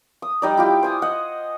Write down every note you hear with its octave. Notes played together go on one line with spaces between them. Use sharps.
D#6
G3 D#4 D5
E4 F4 G4
C5 G#5 D#6
D#5 F#5